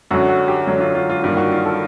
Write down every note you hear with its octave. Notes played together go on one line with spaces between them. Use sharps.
F#2 D3 F#3 F#4
F#4
G4
F#2 D3 F#3
F4
F4
F4
G2 D#3 G3 A#3 F4
F#4
F4
A4